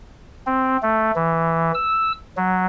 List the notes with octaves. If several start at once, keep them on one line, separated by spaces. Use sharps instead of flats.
C4
A3
E3
E6
F#3